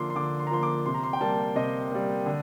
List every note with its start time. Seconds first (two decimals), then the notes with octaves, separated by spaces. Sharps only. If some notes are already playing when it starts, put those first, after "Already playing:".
Already playing: D3 F3 A#3 C6 D6
0.10 C6
0.15 D3 D6
0.39 C6
0.47 A#5
0.51 F3 A#3 C6
0.63 D6
0.86 C3 C6
0.94 A#5
1.03 C6
1.13 G5
1.21 G3 A#3 A5
1.55 C3 D#5
1.91 G3 A#3
2.26 D3